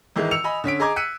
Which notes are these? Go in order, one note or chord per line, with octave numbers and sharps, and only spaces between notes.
G#1 D#3 E3 G#3
E6 C#7 F7
D#5 G#5 B5 D#6
D3 C#4 B6 D7
G#4 D#5 A#5 D6 G#6
E6 F#6 B6 C#7 D#7